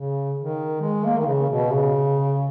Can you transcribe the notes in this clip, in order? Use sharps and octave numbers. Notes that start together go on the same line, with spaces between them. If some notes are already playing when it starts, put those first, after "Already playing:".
Already playing: C#3
D#3
G#3
A#3
D#3
C#3
B2
C#3